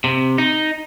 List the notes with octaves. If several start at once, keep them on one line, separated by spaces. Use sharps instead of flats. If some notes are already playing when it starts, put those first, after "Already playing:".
C3
D#4